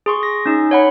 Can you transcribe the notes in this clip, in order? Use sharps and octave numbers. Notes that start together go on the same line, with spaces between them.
G#4 C6 C#6
A#6
C#4 D#4
C#5 F#5 B5